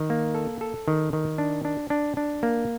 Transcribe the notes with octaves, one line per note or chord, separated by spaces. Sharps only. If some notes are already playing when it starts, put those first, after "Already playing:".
Already playing: D#3
A#3
A4
A4
D#3
D#3
D4
D4
D4
D4
A#3